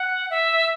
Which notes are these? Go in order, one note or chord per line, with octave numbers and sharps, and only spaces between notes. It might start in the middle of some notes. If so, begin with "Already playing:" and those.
Already playing: F#5
E5